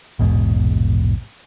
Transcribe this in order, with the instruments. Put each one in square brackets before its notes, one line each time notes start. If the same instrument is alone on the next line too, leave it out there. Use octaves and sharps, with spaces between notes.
[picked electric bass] A#1 E2 G#2 B2